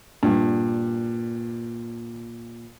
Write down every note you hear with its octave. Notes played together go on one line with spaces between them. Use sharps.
G2 A#2